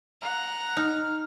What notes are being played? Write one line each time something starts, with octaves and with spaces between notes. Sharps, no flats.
F#5 A#5
D#4 F6